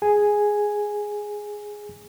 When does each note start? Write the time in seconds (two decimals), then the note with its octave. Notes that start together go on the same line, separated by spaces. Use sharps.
0.02 G#4 G#5